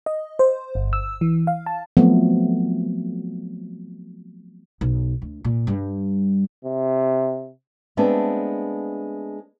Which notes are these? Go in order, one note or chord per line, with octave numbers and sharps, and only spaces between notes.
D#5
C5
G1
E6
E3
F5
A5
F3 F#3 A3 B3 C4
B1
D2
A#2
G2 G3
C3
G#3 A3 B3 C4 D4